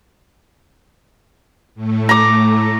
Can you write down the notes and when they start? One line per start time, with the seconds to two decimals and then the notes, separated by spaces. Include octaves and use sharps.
1.75 A2 A3
2.09 A#5 D6